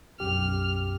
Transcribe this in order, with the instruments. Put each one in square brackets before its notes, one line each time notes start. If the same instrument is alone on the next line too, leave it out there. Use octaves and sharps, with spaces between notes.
[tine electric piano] B1 F#2 G4 [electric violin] F6